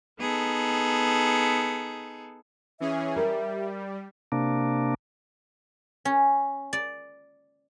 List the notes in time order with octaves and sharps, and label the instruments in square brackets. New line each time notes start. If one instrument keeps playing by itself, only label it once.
[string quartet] B3 D#4 G#4 A4
[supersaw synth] E3 C#4 G#4 [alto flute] E5
[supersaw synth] G3 [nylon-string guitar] A#4
[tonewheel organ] C3 A#3 D4
[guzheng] C#4
D5